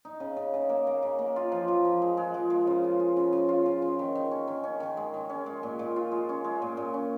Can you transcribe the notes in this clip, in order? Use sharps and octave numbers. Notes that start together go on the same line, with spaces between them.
D#4
C#3
C#3
C#3
A#3
A#3
C#3
A#3
F4
F3
F3
F3
G#3
G#3
F3
G#3
C#3
F4
F4
C#3
C#3
F4
C#3
C#3
D#3
D#3
C#4
D#3
C#4
D#3
G#3
D#3
C#4
G#3
A#2
A#2
F4
G#3
C#4
G#3
A#2
A#2
C#4